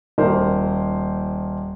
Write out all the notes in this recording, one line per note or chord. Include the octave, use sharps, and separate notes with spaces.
D#1 A#4 C5